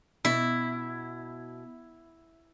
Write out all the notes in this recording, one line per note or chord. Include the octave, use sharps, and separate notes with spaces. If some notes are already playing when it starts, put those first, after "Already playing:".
B2 E4